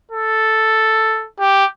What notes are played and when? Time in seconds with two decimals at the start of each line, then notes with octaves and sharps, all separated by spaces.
0.11 A4
1.40 G4